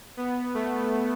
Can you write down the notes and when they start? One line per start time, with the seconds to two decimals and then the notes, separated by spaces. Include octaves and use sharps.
0.17 B3
0.54 A3